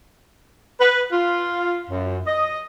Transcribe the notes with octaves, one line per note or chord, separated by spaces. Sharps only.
B4
F4
F#2
D#5